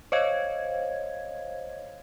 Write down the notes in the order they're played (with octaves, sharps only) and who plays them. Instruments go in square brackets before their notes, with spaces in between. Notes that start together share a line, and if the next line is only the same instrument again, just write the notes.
[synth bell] C5 C#5 D#5 F5 G#6